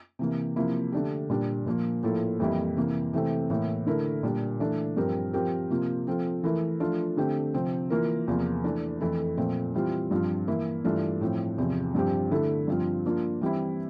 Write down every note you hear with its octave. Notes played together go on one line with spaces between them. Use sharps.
C3 E3 A#3
C3 F3 A#3 E4
D3 A3 D4 G4
A#2 G3 D4
A#2 F3 A#3
A2 F3 A#3 E4 A4
F2 E3 G3 A#3 E4
C3 E3 A#3
C3 E3 A3 C4
A2 E3 A#3 E4
D3 A3 E4 A#4
A#2 G3 D4
E3 A3 D4
G2 F3 C4 G4 A#4
F3 C4 G4 A#4
C3 F3 A#3 F4
F3 C4 F4 A4
E3 A3 E4 A#4
F3 A3 D4 F4
D3 A3 C4 G4
C3 F3 C4
E3 A#3 F4 A#4
E2 C3 F3 A#3 F4
E3 A3 D4
F2 E3 A3 E4 A4
A#2 F3 A3 C4
E3 G3 C4 F4
G2 F3 C4 F4
E3 A#3 E4 A#4
G2 E3 A3 D4 F4
A2 F3 C4
E2 C3 F3
G2 F3 C4 G4
D3 A3 E4 A4
G2 F3 C4 F4
F3 A#3 D4 F4
E3 G3 C4 E4